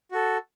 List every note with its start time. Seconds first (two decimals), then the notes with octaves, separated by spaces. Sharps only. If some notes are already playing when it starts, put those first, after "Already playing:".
0.12 F#4 A4